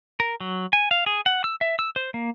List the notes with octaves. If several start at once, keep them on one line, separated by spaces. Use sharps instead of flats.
A#4
F#3
G#5
F5
G#4
F#5
E6
E5
E6
C5
A#3